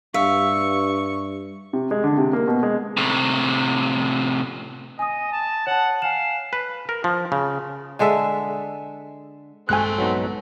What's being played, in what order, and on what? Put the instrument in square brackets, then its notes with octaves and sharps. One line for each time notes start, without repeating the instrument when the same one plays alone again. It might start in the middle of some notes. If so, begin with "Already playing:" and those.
[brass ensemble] G2 [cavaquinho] E5 [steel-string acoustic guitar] F5 [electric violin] C#6
[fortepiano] C3
G#3
D3
C3
A#3
B2
G#3
[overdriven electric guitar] A2 C3
[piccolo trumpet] D#5 [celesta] G#5 D#6
[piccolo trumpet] A5
[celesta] C#5 A5 [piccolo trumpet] F#5
[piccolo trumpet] F5 [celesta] G#5 E7
[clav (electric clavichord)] B4
A#4
F3
C#3
[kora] D3 G#3 A4 E5
[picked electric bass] A#1 G2 G#3 [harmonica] A3 C4 [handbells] G#5 F#6
[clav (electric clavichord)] F#3 B3 D#4